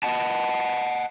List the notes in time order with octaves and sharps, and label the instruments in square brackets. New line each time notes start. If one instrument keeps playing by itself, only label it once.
[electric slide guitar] D#5 F#5 A5